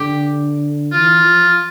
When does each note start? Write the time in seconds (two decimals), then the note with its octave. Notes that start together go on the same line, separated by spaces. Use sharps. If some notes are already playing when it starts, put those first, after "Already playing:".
Already playing: D3 G4
0.92 E3 F4
1.22 F3